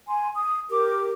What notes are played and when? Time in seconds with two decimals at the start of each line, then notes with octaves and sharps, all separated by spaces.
0.08 G#5 C6
0.35 D#6
0.70 G4 A#4 D6